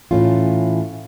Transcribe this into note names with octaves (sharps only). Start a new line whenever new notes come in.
A2 E3 A3 C#4 F4